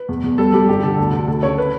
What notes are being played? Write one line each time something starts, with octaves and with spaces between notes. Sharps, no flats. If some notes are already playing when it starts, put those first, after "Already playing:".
Already playing: B4
E2
E2
G3 A4
G3 G4
G1 G4
D3 A4
D2
D2
D2 A4
C#3 C#5
B4